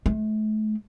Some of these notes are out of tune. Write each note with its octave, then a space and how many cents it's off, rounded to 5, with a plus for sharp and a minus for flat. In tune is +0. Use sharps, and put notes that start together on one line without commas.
A3 -35